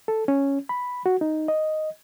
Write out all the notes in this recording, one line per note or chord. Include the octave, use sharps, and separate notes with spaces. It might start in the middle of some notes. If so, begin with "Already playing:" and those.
A4
C#4
B5
F#4
D#4
D#5